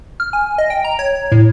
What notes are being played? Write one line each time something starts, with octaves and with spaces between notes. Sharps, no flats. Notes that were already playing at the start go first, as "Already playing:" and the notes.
F6
G#5
D#5
G5
A#5
C#5
A2